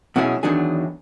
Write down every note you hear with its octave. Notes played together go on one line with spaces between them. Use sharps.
B2 F#3 C#4 E4 G#4
E2 D#3 F#3 D4 G#4